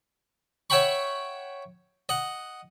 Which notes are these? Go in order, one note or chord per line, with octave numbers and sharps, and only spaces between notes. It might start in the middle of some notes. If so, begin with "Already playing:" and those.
C#5 E5 F#5 G5 B5 C#6
D#5 F#5